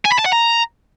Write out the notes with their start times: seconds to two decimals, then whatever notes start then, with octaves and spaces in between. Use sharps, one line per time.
0.05 G#5
0.12 B5
0.19 A5
0.26 F#5
0.33 A#5